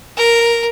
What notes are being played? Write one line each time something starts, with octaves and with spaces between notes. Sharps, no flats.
A#4